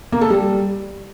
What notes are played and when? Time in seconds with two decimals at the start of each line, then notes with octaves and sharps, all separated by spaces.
0.12 A#3
0.21 A4
0.30 G3